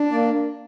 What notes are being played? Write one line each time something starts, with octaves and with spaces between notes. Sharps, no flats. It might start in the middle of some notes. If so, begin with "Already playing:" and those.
Already playing: D4
A#3 D5